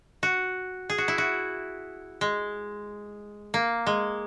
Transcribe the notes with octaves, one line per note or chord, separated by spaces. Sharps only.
F#4
G#4
F#4
E4
F#4
G#3
A#3
G#3